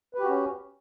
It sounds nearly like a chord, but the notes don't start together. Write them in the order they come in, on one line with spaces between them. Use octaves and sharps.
B4 G4 F#4 C#4